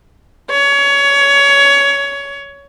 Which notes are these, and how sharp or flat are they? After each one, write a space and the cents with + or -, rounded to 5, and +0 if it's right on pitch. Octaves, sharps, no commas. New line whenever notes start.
C#5 +20